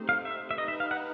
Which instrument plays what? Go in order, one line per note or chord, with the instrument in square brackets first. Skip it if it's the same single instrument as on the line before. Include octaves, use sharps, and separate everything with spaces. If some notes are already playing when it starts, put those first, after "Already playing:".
Already playing: [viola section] A3 C4 D#4 G4 C5
[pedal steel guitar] F5
E5
E5
[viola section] D#4 G4 B4 [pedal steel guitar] D#5
[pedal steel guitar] E5
F5
F#5